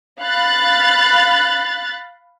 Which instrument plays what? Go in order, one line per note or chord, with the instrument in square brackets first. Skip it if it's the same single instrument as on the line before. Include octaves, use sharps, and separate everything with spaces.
[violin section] F5 B5 F#6 A6